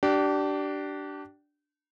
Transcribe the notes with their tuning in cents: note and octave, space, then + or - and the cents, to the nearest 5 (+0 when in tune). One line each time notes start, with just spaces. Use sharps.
D4 +0 G4 -30